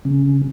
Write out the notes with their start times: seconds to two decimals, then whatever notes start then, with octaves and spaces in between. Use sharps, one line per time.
0.05 C#3